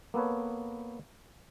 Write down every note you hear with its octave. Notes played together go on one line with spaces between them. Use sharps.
A#3 B3 A4 B4 C#5